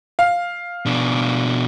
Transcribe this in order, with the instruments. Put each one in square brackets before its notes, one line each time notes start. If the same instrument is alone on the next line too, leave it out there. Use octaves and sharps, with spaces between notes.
[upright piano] F5
[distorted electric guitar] B2 D4